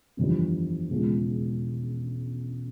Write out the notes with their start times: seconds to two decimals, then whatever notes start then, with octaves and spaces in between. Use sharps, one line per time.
0.17 G1 F2 E3 G3
0.90 E1 E2 C#3 F3 G#3